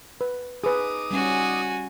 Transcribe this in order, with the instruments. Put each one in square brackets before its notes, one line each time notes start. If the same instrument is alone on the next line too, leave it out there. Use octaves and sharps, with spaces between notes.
[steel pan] B4
[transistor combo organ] D#4 D6 D#6 [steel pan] G#4 B4
[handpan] G3 C#4 [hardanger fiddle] F#4 G#5